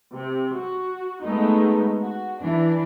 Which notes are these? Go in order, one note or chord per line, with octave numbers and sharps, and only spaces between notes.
C3
F#4
G#3 A3 B3 D#4
F#4
E3 D4